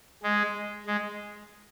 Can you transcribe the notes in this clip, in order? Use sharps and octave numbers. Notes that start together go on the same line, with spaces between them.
G#3
G#3